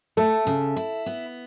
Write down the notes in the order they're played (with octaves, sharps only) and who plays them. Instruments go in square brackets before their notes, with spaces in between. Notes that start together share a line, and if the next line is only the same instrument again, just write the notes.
[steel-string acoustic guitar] A3 [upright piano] A4
[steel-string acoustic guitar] C#3
E4
B3